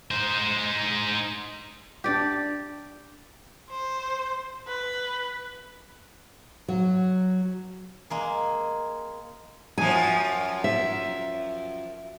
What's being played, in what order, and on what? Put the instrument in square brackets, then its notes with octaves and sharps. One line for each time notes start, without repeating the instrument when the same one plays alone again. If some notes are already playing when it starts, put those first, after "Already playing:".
[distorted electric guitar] D#4 C5
[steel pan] D4 G5 [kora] G4 D5
[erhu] C5
B4
[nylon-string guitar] F#3
[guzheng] G#3 A#3 G#4
[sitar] F#2 F3 [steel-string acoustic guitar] G#5
[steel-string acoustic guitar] E5